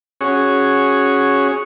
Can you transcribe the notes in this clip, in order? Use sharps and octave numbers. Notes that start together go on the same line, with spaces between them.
C#4 F#4 G#4 C#5